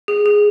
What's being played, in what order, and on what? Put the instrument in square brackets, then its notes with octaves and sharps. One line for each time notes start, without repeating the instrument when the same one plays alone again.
[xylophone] G#4
G#4